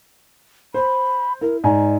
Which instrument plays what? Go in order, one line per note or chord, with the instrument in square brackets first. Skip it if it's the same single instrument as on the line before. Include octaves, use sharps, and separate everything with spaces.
[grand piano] C5 [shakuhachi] B5
[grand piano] E4 [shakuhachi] A#4
[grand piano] G#2 G#5 A#5 [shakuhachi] D5